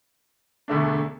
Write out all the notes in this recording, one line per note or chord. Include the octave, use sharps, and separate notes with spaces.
E1 D2 D3 A3 D4